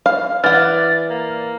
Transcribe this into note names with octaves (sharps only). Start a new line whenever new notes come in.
F5
E3 D5 F#5 F6
A#3